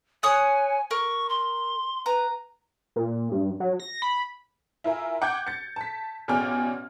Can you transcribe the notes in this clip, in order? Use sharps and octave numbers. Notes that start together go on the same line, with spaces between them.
C#5 G#5 D#6 F#6
A#4 C#6
C6
B4 A#5
A#2
G2
F#3
A#6
B5
E4 F4 A#4 E5 G#5
F#5 G5 D6 G6 G#6
A6 C#7
A5 B6
A1 B2 G#4 D5 G5 F6